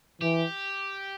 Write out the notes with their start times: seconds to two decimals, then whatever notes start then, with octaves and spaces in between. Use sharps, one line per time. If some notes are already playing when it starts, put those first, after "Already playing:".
0.21 E3 G4